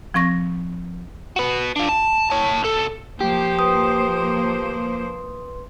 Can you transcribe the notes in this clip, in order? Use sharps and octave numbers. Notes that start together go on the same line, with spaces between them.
F3 C4 C#6 A#6
F#4 B4
D4 F4
A5
C#5 A5
B1 A4
F3 A#3 G4 C5
B4 C6 D#6